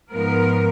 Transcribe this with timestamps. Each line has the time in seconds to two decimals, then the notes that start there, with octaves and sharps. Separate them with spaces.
0.12 G#2 F3 B3 A#4